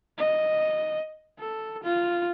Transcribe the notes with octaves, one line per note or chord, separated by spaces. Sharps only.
D#5
A4
F4